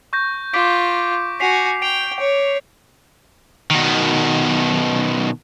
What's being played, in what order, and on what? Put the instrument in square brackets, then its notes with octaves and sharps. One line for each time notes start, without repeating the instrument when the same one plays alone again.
[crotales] C#6 G6 A#6
[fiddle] F4 [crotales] D6 B6 D7
[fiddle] F#4 G#5 [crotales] B6 C7 F7
[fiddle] G5 [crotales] D7 F7
[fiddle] C#5
[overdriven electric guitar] B2 D#3